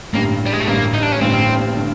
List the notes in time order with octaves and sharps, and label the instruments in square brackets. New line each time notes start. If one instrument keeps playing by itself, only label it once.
[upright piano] A1 G2 D3 [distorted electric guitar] A#3
[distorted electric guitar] G3
G#3
A3
[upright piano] A1 G2 D3 [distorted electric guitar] A#3
[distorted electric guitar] D#4
D4
C#4
[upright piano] A1 G2 D3 [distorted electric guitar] C4
[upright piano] D3